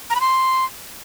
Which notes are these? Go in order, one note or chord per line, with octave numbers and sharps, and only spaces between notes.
A#5
B5
C6